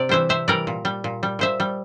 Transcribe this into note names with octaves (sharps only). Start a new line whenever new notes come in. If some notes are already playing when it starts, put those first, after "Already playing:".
Already playing: C3 D5
E3 G3 C5 E5
C3 C5 E5
E3 G3 A#4 D5
A#2
G3
A#2
G3
A#2 C5 E5
G3